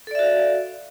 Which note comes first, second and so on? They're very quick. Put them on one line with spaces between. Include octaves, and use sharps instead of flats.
A4 D5 E5 F#4 F5